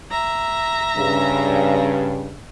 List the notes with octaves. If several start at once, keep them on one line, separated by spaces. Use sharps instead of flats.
E5 A#5
G2 C#3